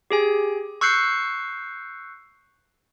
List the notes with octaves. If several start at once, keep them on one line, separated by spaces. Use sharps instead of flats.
G4 G#4 G#5
C#6 E6 F#6 G6 C7 C#7